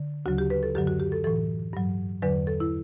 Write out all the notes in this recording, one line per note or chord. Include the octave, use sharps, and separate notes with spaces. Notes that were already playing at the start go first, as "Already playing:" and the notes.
Already playing: D3
D2 C#3 F#3 F#4
G4
B4
A4
F#2 D3 F#3 G4
F#4
G4
A4
A2 E3 A4
G2 F#3
E2 D3 F#3 B4
A4
E4